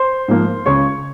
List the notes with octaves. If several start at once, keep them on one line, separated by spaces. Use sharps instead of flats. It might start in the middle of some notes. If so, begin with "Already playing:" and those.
Already playing: C5 C6
G#2 F3 A#3
C#2 C#3 G#3 C#5 C#6